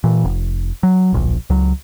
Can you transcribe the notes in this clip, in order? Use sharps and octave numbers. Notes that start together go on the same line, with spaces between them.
A#2 E3
F1
F#3
D1 A#1
C#2 F#3